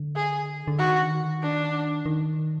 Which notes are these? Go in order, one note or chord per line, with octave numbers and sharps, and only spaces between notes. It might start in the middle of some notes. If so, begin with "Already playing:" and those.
Already playing: D3
G#4
D3
D#3 F#4
D4
D#3